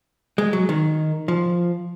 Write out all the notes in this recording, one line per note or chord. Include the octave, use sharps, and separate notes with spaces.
G#3
F#3
D#3
F3